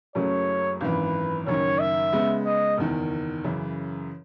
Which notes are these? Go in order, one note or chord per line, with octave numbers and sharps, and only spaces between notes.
F#1 F#2 C#3 F#3 A3 C#5
G#1 F#2 E3 B4
F#1 F#2 D#3 C#5
E5
C#3 G#3 B3
D#5
F#1 E2 D#3
F#2 C#3 E3